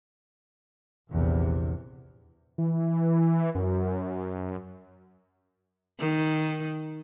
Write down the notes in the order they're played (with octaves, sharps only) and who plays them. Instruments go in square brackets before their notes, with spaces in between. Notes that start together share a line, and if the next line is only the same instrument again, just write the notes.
[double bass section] A#1 E2 C3
[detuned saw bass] E3
F#2
[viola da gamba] D#3